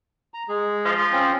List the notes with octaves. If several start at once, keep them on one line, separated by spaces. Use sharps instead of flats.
A#5
G#3 G#4
F3
C4 C#4 F4